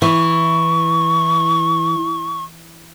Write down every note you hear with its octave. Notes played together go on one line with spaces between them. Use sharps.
E3 C#6